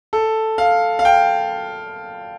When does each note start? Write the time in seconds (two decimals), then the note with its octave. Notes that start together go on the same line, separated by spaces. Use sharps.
0.13 A4
0.58 F5
0.99 F5
1.05 G5